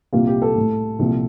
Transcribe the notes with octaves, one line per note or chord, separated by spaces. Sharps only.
C2 A#2 G3 A#3 F4
G4
A4
A2 A3
C2 A#2 F3